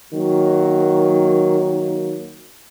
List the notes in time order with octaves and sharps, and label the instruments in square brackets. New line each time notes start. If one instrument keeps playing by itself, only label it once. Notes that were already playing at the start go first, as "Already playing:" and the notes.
[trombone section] D#3 F#3 A#3